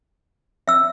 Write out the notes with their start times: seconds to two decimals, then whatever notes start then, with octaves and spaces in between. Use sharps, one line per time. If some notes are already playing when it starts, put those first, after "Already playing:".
0.68 E5 E6